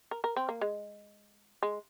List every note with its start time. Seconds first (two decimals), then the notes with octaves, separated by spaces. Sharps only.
0.11 A#4
0.24 A#4
0.36 C4
0.49 A#3
0.61 G#3
1.63 G#3